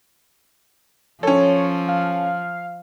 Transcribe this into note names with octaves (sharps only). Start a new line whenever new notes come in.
F3 C#4 A4 C#5
F5